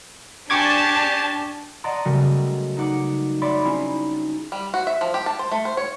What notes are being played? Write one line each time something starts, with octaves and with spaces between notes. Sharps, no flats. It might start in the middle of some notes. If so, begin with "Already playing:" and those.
D4 G4 G#5 A5 C#6 D6 G#6
D5 D#5 F#5 A5 A#5 C6
C#3 F#3 G3 A3 F#4 A#4
D#4 C5 F#5 D6 C#7
C#5 D5 E5 B5 C6 D6
C4 C#4 D#4 E4 G#4 C5
G3
F#4
E5
F3
G4
A5
C5
A3
C5
C#5